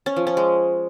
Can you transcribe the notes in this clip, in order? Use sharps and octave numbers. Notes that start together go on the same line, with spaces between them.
C#4
F3
C#4
G#3